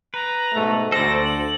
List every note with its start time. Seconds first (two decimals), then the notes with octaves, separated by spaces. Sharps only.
0.14 B4 A#5
0.53 G#2 B2 A3
0.92 D2 A4 C5 D5 A#6
1.25 F#7